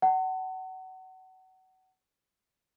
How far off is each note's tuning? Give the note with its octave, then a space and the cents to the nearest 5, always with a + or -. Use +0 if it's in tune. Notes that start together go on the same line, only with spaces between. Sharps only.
F#5 +25 A5 +40